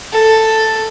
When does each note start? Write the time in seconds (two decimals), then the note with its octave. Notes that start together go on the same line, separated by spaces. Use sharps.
0.13 A4